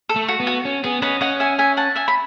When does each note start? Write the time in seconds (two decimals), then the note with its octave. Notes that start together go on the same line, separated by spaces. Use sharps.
0.09 A4
0.16 A3
0.28 F#4
0.40 B3
0.47 F#4
0.65 C#4
0.84 B3 G#4
1.02 C#4 B4 D#5
1.21 C#4 D#5 F#5
1.40 E5 G#5
1.59 E5 G#5
1.77 F#5 A5
1.96 E5 G#5
2.08 B5